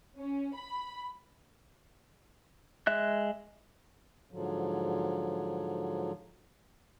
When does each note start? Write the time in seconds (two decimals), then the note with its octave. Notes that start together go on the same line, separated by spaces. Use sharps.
0.17 C#4
0.53 B5
2.87 G#3 E5 F#6
4.31 G#2 D3 F3 F#3